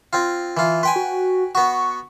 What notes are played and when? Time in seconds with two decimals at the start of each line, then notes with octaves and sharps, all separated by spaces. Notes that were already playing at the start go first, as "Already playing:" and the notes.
0.13 C4 F4
0.57 E3 F4
0.83 B4 G5 G#5 C6
0.96 F#4
1.55 B3 F#4 C#6